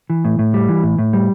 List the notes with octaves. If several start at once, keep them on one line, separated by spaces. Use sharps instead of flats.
E3
A2
A2
G3
E3
A2
A2
G3